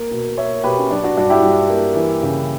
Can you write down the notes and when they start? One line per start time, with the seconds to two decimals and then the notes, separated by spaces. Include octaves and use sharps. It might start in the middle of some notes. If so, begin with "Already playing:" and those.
Already playing: A#3
0.11 B2
0.38 A#3 C#5 E5
0.64 B2 G4 B4
0.78 C#4
0.90 F#3 D4
1.04 D4 F#4
1.17 G2 D4 F#4
1.30 E4 G4
1.43 G2
1.69 A#3
1.96 E3
2.23 C#3